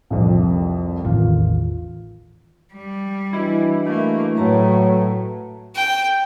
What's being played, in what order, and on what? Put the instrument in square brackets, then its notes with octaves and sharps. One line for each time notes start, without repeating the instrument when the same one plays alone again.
[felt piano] C2 F2
[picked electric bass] A1 E2 D#3 [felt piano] F4
[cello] G3
[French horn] E3 [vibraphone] D4 F#4 D#5 [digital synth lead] E4
[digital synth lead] A3 [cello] A#3
[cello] A2 [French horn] F#3 [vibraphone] B4 A5 A#5
[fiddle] G5